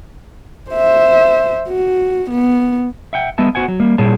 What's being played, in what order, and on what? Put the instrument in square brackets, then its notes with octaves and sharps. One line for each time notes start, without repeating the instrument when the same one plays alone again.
[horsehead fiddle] C5 E5
F#4
B3
[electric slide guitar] E5 F#5 G5
G3 B3 D#5 E5 A5
B3 F#4 C5 F#5 G#5
F#3
G3 A#3
A#2 G3 G#4 C#5 A5